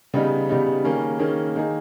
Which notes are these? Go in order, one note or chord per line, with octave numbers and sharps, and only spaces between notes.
C#3 G3 B3 D#4
C#3 G3 B3 D#4
D#3 A#3 C#4 G#4
D#3 A#3 C#4 G#4
D#3 A#3 D#4 G#4